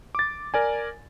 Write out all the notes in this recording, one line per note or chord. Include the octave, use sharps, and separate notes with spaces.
D6 A6
A#4 D5 G#5